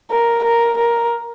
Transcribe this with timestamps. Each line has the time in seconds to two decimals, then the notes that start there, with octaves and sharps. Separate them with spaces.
0.11 A#4
0.44 A#4
0.77 A#4